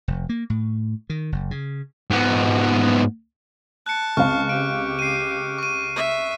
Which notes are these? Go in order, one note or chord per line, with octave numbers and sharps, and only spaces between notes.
F1
A#3
A2
D#3
F#1
C#3
G#2 B3
A5 F#6 C#7
C#2 C4 F5 C#6 F6
G4 D7
C7 D#7
C#6 D#7
E5